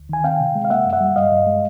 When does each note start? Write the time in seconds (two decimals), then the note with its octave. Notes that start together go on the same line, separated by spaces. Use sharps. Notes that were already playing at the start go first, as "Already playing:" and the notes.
Already playing: D2
0.09 D#3 G#5
0.24 C4 F5 G5
0.40 C3
0.55 G#3
0.65 F5
0.70 A#3 E5 F#5
0.86 F#2
0.93 E5 F#5
1.01 G3
1.16 G2 D#5 F5
1.32 G2
1.47 G#3